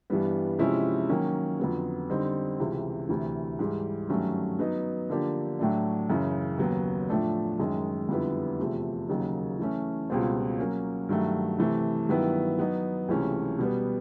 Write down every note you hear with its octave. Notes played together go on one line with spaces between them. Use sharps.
G2 E3 G3 B3
C3 F3 G#3 C#4 E4
D#3 F#3 A#3 C#4
F2 D3 F#3 B3
D3 G3 C4 D#4
C#2 C3 E3
D2 C3 E3
G#2 E3 G3
G2 D#3 F#3 A3 C#4
F#3 B3 D#4
D3 F3 A#3 D4 G4
A2 F#3 A3 D4
F#2 C#3 E3
D#2 C#3 F#3 B3
A2 F3 A3 D4
F#2 D#3 G#3
F2 D3 G3 B3 E4
E2 C3 F3 A3
D#2 C#3 F#3 A#3 D#4
E3 A3 C#4
C#2 B2 G3 C4 F4
F#3 A#3 C#4
G2 D#3 F#3 A3
C3 E3 A3
G2 D#3 F#3 B3 E4
F#3 B3 D#4
C#2 C3 E3 A3 C#4
B2 G3 B3